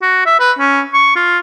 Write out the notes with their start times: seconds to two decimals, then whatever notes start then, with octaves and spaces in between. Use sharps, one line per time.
0.02 F#4
0.26 E5
0.40 B4
0.59 C#4
0.94 C#6
1.16 F4